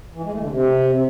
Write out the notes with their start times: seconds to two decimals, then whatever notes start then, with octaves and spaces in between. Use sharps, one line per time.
0.15 E3
0.24 G#3
0.32 A3
0.41 D3
0.49 C3